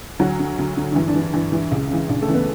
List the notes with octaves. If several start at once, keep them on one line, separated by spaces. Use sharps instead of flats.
D2 F#3 F#4
D3
D2
D3
D4
G2 E3 E4
D4
E3
D4
G2 E3 E4
E3
C#2
C#3 E3
C#2 D4
A3 A4
C#3 E3
B3 B4